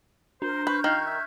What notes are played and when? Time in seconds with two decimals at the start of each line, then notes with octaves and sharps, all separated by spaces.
0.42 D4 A#4 C5
0.67 B4 C#6 F6 G6
0.84 D#3 F5 F#6 G#6
1.06 E5